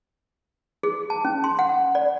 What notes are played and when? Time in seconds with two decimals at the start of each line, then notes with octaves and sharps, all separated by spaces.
0.83 G#4
1.10 A5
1.25 C#4
1.44 C6
1.59 F#5
1.95 D5